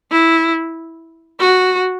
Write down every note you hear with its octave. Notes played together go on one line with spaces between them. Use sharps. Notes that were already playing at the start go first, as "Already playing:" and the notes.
E4
F#4